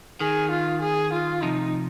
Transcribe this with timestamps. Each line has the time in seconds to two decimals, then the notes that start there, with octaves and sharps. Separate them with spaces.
0.20 D#3 G#4
0.51 F4
0.81 G#4
1.13 F4
1.42 C3 F3 D#4